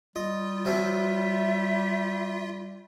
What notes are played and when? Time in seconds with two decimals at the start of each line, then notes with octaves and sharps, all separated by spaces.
0.16 G3 F4 D#5
0.65 F3 F#3 C4 E5